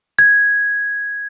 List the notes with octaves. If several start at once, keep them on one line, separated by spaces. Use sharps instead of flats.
G#6